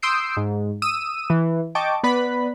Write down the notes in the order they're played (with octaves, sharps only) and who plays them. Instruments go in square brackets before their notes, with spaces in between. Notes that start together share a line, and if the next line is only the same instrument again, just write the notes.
[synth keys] C6 D#6 E6 G6 C7 D7
G#2
D#6 E6 D#7
E3
D#5 G5 A5 C#6 D6
B3 B4 D5 B5